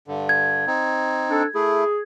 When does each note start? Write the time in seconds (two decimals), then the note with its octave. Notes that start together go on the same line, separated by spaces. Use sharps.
0.08 G2 D3
0.29 G#6
0.67 C4 D#4
1.30 D4 A4
1.55 A3 E4 G#4